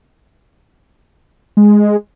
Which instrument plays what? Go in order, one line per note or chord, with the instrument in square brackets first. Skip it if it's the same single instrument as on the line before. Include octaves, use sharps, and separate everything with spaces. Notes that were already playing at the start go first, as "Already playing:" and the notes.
[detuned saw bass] G#3